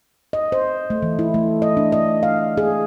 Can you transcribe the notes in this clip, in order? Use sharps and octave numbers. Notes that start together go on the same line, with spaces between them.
D#5
C5
A3
E3
E4
A3
D#5
D4
D#5
F5
G#4